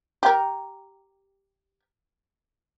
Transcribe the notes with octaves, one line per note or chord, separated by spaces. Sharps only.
G4 A#4